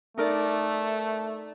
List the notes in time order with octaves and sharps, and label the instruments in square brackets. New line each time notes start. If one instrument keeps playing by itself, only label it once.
[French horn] A3 [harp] D#4 A#4 D5